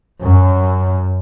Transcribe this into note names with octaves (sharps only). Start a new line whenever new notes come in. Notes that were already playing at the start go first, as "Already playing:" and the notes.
F#2